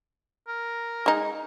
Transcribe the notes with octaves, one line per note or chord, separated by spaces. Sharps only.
A#4
G#3 D#4